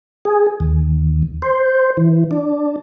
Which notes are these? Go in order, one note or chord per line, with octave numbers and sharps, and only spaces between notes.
G#4
D#2
C5
E3
D4